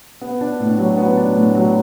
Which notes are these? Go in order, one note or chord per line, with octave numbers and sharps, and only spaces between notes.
B3
D4
A2
F#3
B3
D4
A2
F#3